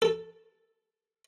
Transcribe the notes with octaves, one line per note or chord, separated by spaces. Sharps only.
A4